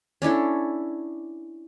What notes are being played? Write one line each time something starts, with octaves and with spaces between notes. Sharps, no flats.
C#4 D4 E4 A4